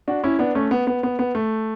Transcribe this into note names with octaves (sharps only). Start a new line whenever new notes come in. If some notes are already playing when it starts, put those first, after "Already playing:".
D4 F#4
C#4 E4
B3 D4
A3 C#4
B3
B3
B3
B3
A3